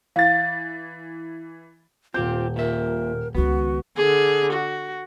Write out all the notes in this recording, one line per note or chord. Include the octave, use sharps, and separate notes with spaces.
E3 F5 A6
D#1 C4 F4 G4 G6
A#2 A#4 E5
C#2 D#3 B3 F#4
D3 G#4
F#4